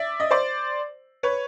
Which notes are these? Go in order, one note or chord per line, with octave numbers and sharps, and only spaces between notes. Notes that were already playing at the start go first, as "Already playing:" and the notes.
Already playing: D5 E5
D#5
C5 D5
B4 C#5